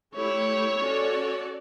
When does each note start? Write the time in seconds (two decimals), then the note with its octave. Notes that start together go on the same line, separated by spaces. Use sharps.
0.15 A3 E4 G4 C#5
0.78 C#4 F#4 A4 D5